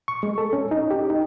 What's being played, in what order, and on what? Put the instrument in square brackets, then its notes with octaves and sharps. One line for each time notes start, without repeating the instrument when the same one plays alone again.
[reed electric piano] C#6
G#3
A4
C#4
D#4
G4
D#4